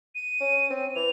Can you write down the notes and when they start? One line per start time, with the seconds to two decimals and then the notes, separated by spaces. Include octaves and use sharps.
0.15 D#7
0.40 C#4
0.70 C4
0.96 E3 F7